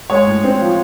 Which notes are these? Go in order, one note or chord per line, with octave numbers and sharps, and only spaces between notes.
G#3 C#5
A2
C4
F3